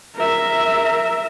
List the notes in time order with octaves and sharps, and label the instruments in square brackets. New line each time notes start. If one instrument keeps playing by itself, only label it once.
[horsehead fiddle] A#4 E5